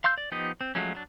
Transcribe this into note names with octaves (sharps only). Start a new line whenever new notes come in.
F5 C6 E6 G6
D5
F3 B3 D#4 G4 D#5
C4
F3 F#3 G#3 A3 C#4
F#3 D4